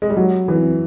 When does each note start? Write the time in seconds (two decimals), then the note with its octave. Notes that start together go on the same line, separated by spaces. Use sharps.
0.02 G#3
0.10 G3
0.17 F#3
0.48 E3